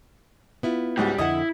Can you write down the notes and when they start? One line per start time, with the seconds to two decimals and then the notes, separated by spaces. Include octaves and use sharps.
0.63 B3 E4 F4
0.97 C#2 G#2 G3 F#4
1.18 F2 D3 E4 D#5 F#5